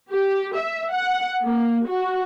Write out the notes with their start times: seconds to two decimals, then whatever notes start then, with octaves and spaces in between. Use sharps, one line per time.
0.10 G4
0.55 E5
0.91 F#5
1.44 A#3
1.86 F#4